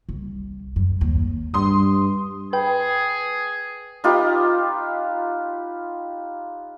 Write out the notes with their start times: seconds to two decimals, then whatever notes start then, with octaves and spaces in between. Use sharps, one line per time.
0.09 C2
0.76 F#2
1.01 D#2
1.54 G2 C6 D#6
2.53 G#4 B4 G5
4.04 D#4 F4 G4 B4